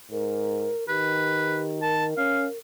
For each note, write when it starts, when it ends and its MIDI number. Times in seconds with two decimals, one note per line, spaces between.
0.12 0.72 44
0.12 0.87 70
0.88 2.13 51
0.88 1.80 67
0.88 1.62 71
1.82 2.58 70
1.82 2.06 81
2.17 2.47 61
2.17 2.45 77